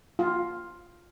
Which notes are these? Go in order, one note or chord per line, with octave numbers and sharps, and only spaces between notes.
F4